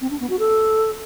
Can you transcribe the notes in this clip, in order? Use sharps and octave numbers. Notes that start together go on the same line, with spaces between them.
C4
D4
B3
F#4
A4